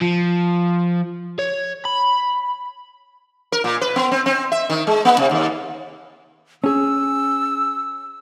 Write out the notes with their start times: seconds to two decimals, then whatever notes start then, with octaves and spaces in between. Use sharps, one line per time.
0.02 F3
1.39 C#5
1.85 B5
3.52 A#4
3.64 A#2
3.81 B4
3.96 B3
4.11 C4
4.26 C4
4.52 E5
4.70 D#3
4.87 G#3
5.05 A#3
5.18 C3
5.31 D#2
6.64 C#4 G#4 E6